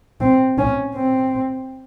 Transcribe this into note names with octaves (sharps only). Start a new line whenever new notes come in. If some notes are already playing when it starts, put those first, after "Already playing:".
C4
C#4
C4